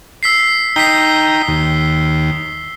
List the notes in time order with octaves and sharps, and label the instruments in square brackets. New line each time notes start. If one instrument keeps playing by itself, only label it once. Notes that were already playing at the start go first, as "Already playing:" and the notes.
[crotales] E6 B6 C7
[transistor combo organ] D#4 G5 A#5 [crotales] B6 C7 G7
[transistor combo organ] D#2